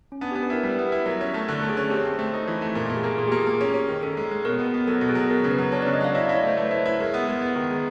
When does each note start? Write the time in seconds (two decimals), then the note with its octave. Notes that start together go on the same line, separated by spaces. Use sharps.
0.12 C#4
0.21 B3 D4
0.31 B3 G4
0.43 B4
0.50 E4 A#4
0.63 G3 B4
0.78 B3
0.92 E4
1.06 F#3 A#4
1.21 C#4
1.34 A3
1.48 D3
1.63 A3
1.69 G#4
1.77 C#4
1.90 C4 G4
2.05 C4
2.19 A3
2.34 D#4
2.47 E3
2.62 A3
2.75 A#2
2.90 A#2
2.97 G#4
3.04 A#3
3.18 A#2 G#4
3.28 A#3 G4
3.37 G#4
3.47 A#3
3.61 C#4
3.74 C#4
3.89 D#3
4.03 C#4 A4
4.17 G#3
4.31 G#3
4.45 B2 A#4
4.59 B3
4.66 A#4
4.74 B3
4.87 F#3 A4
5.01 B2
5.09 G#4
5.15 F#3
5.30 B3 A#4
5.44 C#3
5.51 B4
5.58 F#3
5.72 D4 C#5
5.82 C#3 D5
5.94 D#5
6.00 F#3 F5
6.15 E4 D#5
6.26 E4 D5
6.35 C#5
6.43 A3 C5
6.57 A3 B4
6.71 E4
6.86 E4
7.00 G#3 A#4
7.14 B3
7.28 G#3
7.42 B3
7.55 D#3
7.70 G#3